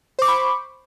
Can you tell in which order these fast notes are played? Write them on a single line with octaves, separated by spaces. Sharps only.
C5 D6 C#6 B5